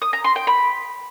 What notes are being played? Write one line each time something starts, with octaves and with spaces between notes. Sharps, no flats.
D#6
A#5
C6
G5
B5